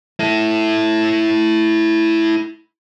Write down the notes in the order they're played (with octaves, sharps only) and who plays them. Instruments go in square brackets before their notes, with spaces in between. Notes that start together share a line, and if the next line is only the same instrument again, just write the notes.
[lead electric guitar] E4 A4